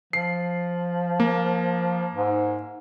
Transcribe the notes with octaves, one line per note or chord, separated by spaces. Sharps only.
F3 C7
A#3
G#2